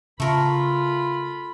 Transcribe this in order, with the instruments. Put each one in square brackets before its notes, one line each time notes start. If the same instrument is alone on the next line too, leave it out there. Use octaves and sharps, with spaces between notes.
[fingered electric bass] C#3 [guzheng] A3 A#4 [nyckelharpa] F4 B5